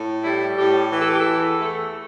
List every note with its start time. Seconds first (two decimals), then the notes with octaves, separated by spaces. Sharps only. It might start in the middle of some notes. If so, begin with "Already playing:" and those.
Already playing: A2
0.23 G3 E4
0.57 A2 G4
0.92 E3
1.01 A4
1.11 G4
1.20 A4
1.26 E2
1.61 A3